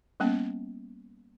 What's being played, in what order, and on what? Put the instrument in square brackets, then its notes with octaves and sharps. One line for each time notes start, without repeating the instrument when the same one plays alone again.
[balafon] G3 A#3 B3 C#4